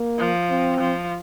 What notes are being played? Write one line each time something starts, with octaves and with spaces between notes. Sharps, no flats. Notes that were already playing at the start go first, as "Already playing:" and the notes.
Already playing: A#3
F3
C4
F3